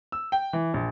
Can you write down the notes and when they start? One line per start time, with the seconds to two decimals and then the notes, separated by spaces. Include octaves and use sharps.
0.12 E6
0.32 G5
0.53 E3
0.74 A#1